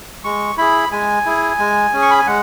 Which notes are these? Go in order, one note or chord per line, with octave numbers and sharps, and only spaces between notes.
G#3 C#6
E4 G#4 B5
G#3 G#5
E4 G#4
G#3
C#4 G#4
C#6
B5
G#5
G#3 F#5